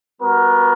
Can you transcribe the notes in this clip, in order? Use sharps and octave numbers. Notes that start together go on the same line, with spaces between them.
G3 B3 F#4 A#4